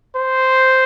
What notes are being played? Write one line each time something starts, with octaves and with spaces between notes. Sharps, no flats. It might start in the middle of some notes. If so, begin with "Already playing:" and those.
C5